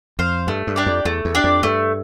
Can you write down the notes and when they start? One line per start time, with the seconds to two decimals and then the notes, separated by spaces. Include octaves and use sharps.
0.19 F2 C5 F5
0.47 G2 A3
0.67 G2
0.76 D4 G4 D5
0.86 F2
1.05 E2 A3
1.25 E2
1.35 D4 G4 D5
1.44 F2
1.63 G2 A3